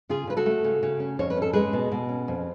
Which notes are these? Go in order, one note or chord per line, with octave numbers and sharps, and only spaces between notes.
C#3 F4 G#4
C#3 B4
F#4 A4
A3
C#3
C#3
C#4
F2 C#5
B4
C#4 A4
G#3 G#4 B4
B2
B2
C#4
F2